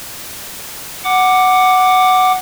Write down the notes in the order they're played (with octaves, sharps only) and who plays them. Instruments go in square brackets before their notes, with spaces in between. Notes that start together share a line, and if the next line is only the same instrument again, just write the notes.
[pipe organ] F#5 D6